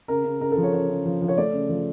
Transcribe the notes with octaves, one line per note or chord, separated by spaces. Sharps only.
C#3 A#4
C#3
C#3 A#4
A4
F3
C#5
C#3 C#5
C#3
F3
F3
C#5
A3 D5
C#3
F3